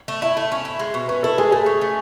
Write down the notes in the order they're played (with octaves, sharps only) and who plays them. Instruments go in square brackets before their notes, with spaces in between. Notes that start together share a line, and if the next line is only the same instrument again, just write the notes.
[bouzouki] A3
[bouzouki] E4 [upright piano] E5
[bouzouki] A3
C#4
E4
G#3
B2
[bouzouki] C#4 [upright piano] B4
[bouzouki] E4 [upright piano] A4
[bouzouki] G#3 [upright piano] G#4
[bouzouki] A3 [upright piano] G#4
[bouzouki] C#4
A3